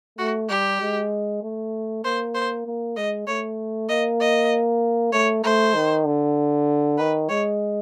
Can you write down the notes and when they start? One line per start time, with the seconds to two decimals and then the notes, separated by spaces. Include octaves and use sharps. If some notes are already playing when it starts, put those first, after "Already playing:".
0.18 A3 F#4
0.49 G3 G4
0.81 G#3
1.43 A3
2.04 A#3 C5
2.35 C5
2.66 A#3
2.96 G#3 D#5
3.27 A3 C#5
3.89 A#3 D#5
4.20 D#5
5.13 A3 C#5
5.44 A3 C5
5.75 D#3
6.05 D3
6.98 D#3 B4
7.29 G#3 C#5